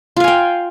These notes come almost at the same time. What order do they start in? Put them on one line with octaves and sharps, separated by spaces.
F4 F5 G#5 G5